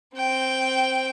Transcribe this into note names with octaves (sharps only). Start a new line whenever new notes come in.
C4 G5